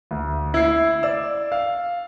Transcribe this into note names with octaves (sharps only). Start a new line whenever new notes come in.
D2
E4 C7
D5 E6
F5